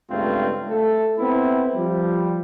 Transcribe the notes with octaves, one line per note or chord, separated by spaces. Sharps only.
C#2 G2 G#3 A3 C4 F4
A3 A4
B3 C4 E4
F3 G3